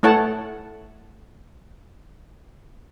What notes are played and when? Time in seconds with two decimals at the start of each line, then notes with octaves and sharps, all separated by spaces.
0.03 A3 E4 C#5 F#5 A5